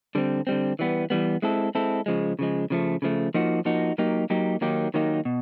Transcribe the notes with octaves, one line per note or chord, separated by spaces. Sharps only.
D3 G3 C4
D3 G3 C4
E3 G3 B3
E3 G3 B3
G#3 C4 E4 A4
G#3 C4 E4 A4
C#3 F3 G#3
C#3 F3 G#3
C#3 F3 A3
C#3 F3 A3
F3 A#3 D#4 F#4
F3 A#3 D#4 F#4
F#3 A#3 D#4 G4
F#3 A#3 D#4 G4
D#3 F#3 A#3 D#4 G4
D#3 F#3 A#3 D#4 G4
B2